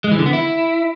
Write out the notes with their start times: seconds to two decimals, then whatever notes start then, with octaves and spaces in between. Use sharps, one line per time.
0.04 G#3
0.11 E3
0.19 D3
0.26 B3
0.33 E4